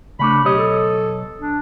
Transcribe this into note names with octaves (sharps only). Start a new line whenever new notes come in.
C#3 A3 D4 B5
B1 G4 C#5 D#5
A4
D4